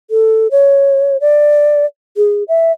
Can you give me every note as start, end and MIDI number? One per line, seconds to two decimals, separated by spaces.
0.10 0.47 69
0.51 1.17 73
1.21 1.86 74
2.17 2.44 68
2.48 2.72 76